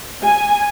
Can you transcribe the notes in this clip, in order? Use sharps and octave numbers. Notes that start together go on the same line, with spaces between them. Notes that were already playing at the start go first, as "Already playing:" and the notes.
G#5